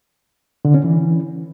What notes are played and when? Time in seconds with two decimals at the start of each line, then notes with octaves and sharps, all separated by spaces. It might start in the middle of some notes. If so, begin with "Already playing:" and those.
0.65 D3
0.74 C#4
0.84 E3